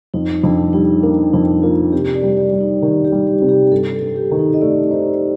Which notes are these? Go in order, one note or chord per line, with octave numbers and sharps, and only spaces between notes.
F2 D#4
F2 D4
G3 D#4
A#3 D4
F2 D#4
A#3 F4
C3 G4
D5
G3
D5
G3
D#4
D#3 G4
G4
G3
G4
C3
G4
G2 A4
A4
G2
G4
D#3
D#4
D#5
A3 D5
D#4 C5